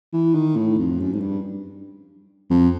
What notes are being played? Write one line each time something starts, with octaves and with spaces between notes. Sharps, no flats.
E3
D#3
A2
F2
F#2
G#2
G2
F2